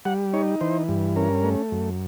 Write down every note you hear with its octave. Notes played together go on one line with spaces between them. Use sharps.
G3 F#5
D#4 C#5
E3 C5
G2
C#4 A#4
A3
F#2